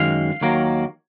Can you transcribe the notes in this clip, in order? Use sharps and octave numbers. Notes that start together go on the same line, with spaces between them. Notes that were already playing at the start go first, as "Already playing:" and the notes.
Already playing: F#2 D#3 G#3 F5
D#2 D#3 F#3 A#3